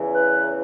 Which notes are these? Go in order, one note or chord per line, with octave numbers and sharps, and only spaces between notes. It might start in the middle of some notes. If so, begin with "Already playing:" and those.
Already playing: E2 C#3 E3
B4